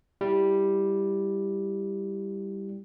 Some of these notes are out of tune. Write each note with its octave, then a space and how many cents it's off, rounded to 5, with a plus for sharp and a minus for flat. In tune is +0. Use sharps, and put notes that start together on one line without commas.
G3 +0 E4 +0